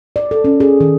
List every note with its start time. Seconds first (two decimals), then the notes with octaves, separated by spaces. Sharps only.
0.16 D5
0.31 A4
0.44 C#4
0.60 G#4
0.80 D#3